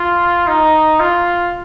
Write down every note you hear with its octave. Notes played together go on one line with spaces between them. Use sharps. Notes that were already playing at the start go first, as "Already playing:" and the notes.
Already playing: F4
D#4
F4